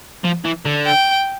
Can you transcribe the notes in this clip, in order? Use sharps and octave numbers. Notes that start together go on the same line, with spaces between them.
F3
E3
D3
G5